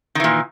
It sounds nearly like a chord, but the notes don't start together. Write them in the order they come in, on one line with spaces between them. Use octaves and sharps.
D#3 E3 A#2